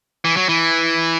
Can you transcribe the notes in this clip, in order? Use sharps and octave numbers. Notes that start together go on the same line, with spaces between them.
E3
F#3
E3